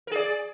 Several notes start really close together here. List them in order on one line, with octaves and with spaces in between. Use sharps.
A#4 G#4 D5